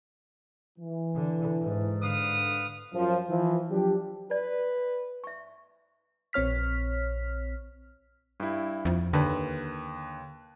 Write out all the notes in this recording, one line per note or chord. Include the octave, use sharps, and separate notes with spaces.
E3
D3
G#2
D3 B4 F5 D#6
F#2 F3
E3 F3
F3 F#3 D4 G4
B4 D5
E5 C#6
A#1 C4 C#5 F6 B6
G2 E4
F2
D#2 D3 B4